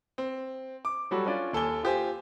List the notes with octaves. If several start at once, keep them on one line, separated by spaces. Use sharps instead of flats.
C4
D6
F#3 G3 F#4 A4
C#4 D4 F4 D5
D#2 A4 G#5 G7
F4 G4 C5 G#5